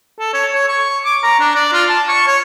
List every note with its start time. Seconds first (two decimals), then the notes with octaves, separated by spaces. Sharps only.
0.19 A4
0.34 C#5
0.54 C#5
0.69 C#6
1.05 D6
1.23 A#5
1.40 D4
1.55 D5
1.73 F4
1.89 A5
2.09 C#6
2.28 C#5